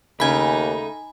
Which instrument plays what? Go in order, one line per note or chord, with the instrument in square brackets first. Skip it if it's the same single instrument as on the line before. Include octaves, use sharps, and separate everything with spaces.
[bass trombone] D#2 [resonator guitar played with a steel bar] C#3 A3 [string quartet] D#4 [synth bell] G#5 B5